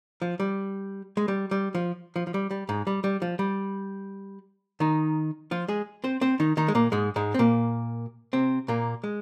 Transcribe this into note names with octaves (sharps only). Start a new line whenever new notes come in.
F3
G3
G#3
G3
G3
F3
F3
F3
G3
G3
G#2 G#3
G3
G3
F3
G3
D#3 D#4
F3 F4
G#3 G#4
C4 C5
C4 C5
D#3 D#4
D#3 D#4
G#3
A#2 A#3
G#2 G#3
G#2 G#3
C4
A#2 A#3
C3 C4
A#2 A#3
G#3